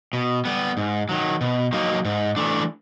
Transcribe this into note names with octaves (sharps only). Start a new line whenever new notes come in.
B2
G3 B3
G#2
D#3 F#3
B2
F#3 A#3 D#4
G#2
E3 A3 D4